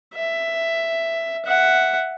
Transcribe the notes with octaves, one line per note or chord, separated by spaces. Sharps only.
E5
E5 F#5